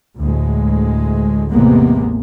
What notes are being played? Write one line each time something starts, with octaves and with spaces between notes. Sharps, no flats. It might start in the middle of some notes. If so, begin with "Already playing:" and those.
D2 A2 G#3
A1 E2 C3 G#3 A#3 B3